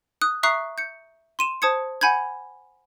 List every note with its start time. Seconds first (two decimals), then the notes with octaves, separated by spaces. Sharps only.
0.21 D#6 F#6
0.43 E5 A#5 C#6 D#6 F#6 C7
0.78 G6 C#7
1.39 C6 D#7 E7
1.62 C5 A5 D#6 G#6 C#7
2.01 F#5 G#5 B5 G6 G#6